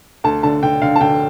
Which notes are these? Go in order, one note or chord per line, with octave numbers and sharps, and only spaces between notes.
D2 A5
D3 A5
D3 G5
D3 F5
A5
D3 G5